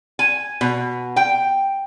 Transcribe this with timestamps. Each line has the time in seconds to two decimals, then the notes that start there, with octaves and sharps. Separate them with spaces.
0.19 G#5
0.61 B2
1.16 G5